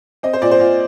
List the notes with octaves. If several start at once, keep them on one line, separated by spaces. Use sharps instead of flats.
C4 D#5
C5
A#2 D5
C5
A#2 F4